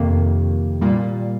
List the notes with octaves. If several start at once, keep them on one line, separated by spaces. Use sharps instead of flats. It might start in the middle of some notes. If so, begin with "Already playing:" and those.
Already playing: F2 C3 D#3 A#3
A#2 G3 A#3